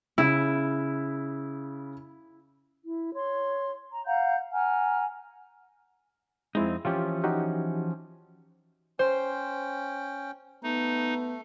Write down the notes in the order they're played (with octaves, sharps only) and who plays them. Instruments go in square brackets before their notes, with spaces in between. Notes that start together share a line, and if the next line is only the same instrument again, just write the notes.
[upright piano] C#3 [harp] E4
[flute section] E4
C#5 C6
A#5
F5 F#5 A#5 G6
F#5 G#5 A#5 F6
[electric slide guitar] F2 C4 D#4 [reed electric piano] G#3 E4
[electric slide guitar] E3 F3 C#4 [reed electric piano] F4 G4
[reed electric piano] D#4 F#4 G4
[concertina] C#4 G5 [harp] C5
[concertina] A3 [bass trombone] B3 [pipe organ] D#4